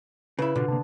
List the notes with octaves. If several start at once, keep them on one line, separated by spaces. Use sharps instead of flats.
C#3 E4 B4
B2 D3 F4 F#4
C3 A#3 D4 A5